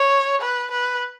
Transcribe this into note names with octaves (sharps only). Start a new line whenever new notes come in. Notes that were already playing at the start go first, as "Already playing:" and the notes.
Already playing: C#5
B4
B4